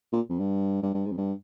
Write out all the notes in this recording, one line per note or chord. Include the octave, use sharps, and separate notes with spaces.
A#2
F2
G2
G2
G2
G#2
F2
G2